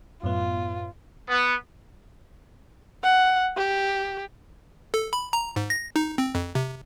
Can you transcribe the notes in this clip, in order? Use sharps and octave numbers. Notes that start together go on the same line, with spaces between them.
F#2 A2 B3 F4
B3
F#5
G4
A4
B5
A#5
G#2
A#6
D#4
C4
F2
C3